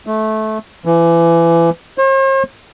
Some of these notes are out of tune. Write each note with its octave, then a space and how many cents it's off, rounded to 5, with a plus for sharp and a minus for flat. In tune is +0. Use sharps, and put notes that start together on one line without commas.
A3 -20
E3 +30
C5 +45